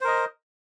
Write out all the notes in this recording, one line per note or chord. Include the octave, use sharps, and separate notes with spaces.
A#4 C5 D#5